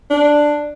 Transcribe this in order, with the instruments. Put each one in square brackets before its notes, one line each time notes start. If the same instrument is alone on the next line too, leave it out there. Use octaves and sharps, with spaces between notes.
[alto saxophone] D4